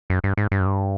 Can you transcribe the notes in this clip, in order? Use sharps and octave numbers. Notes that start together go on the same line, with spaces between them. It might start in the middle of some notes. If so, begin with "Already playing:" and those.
F#2
G2
G#2
G2
F#2
G2